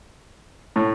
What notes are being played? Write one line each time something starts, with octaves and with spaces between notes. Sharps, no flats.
A2